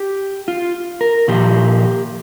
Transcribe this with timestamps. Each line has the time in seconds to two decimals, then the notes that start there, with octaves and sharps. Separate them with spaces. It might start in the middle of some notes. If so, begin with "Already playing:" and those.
Already playing: G4
0.48 F4
1.01 A#4
1.28 A#2 F3 G4